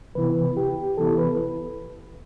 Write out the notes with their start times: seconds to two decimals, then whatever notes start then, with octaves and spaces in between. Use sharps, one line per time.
0.15 C3 E3 B3 E4 B4
0.57 G4
0.97 C3 E3 B3 E4 A4
1.18 B4